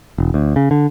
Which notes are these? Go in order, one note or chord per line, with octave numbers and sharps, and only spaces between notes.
E1
D2
C#3
D3